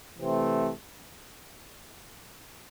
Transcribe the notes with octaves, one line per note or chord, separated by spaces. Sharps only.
C3 E3 A3 C4